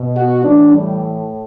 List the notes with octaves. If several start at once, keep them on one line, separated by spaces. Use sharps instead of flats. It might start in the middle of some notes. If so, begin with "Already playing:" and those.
Already playing: B2
F#4
A2 E3 D4
G3